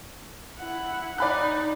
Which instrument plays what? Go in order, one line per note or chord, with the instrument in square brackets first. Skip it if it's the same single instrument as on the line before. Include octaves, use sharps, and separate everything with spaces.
[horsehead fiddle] E4 F#5
[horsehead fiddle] D#4 [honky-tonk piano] D5 B5 F#6